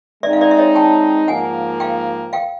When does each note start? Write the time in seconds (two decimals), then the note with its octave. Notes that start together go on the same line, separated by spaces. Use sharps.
0.23 G#3 C4 D#4 D5 E5
0.33 F5
0.41 D5 E5
0.51 E5
0.58 C#5 D#5
0.75 G5 A5
1.28 G#2 F3 A#3 F#5 G#5
1.80 F5 G5
2.33 F5 G5